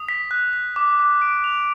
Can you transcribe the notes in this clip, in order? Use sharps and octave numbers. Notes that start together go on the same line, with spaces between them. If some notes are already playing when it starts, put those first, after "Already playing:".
Already playing: D#6
B6
F#6
B6
D6
D6
D7
F7